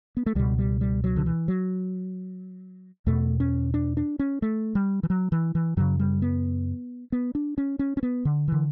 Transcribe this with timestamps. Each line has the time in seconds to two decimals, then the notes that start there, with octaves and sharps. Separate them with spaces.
0.17 B3
0.26 A3
0.35 C#2 B2 G3
0.58 G3
0.81 G3
1.04 F#3
1.16 D3
1.26 E3
1.48 F#3
3.06 E2 B2 A3
3.40 C#4
3.74 D4
3.97 D4
4.19 C#4
4.42 A3
4.75 G3
5.03 E3
5.10 F#3
5.32 E3
5.55 E3
5.77 F#2 C#3 F#3
5.99 G3
6.22 B3
7.12 B3
7.35 D4
7.58 C#4
7.79 C#4
7.97 C#4
8.03 B3
8.25 D3
8.48 D3 E3